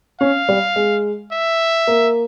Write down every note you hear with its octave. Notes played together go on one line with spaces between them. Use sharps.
C#4 F5
G3
G#3
E5
A#3